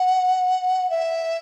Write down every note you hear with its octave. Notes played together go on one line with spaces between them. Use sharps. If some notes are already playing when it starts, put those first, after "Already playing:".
Already playing: F#5
E5